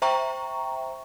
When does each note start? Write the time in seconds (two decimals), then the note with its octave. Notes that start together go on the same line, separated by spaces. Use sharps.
0.02 C5 E5 G5 A#5 C#6